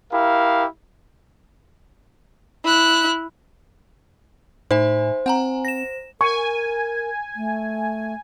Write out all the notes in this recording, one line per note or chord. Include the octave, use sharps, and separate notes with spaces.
E4 G4 A#4 F5
E4 F#6
A2 D#4 C5 E5 G#5
C4 F#5 G#5 A#5
A#6 E7
A#4 G#5 C#6
A3